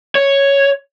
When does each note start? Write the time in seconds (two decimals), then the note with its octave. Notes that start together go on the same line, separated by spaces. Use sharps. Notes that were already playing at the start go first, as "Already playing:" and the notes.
0.15 C#5